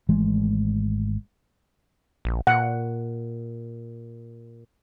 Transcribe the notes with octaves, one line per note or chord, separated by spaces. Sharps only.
G#1 E3 G#3 A3
A#1
A#2 F#5